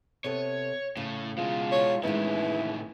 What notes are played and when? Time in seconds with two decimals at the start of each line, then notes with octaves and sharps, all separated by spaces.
0.24 C3 B3 A4 C#5
0.97 A2 C#3
1.38 B2 G#3 F4
1.72 C#5
2.03 A2 D#3 E3 G#3 B3 C#4 E4